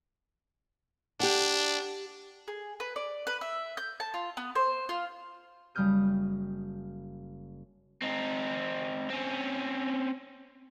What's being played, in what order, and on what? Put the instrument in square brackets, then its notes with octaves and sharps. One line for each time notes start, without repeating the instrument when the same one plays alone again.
[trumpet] D4 [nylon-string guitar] G4 F#5
[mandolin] G#4
B4
D5
B4
E5
G6
A5
F4
B3
C5
F4
[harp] F#1 G3 D#6 F6 G6 D#7
[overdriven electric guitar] C4 D#4
C4 C#4